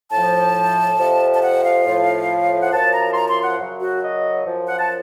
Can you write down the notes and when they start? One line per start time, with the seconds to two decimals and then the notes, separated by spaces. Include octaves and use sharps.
0.11 A2 F3 A5
0.98 F2 C3 F3
1.35 A5
1.41 F#5
1.63 F5
1.85 A2 F3
2.61 F#5
2.71 F#2 F3 A5
2.92 A#5
3.10 C6
3.14 A#5
3.29 C6
3.43 F#5
3.58 F#2 C#3 F#3
3.80 F#4
4.01 D#5
4.44 F#2 F3
4.66 F#5
4.78 A5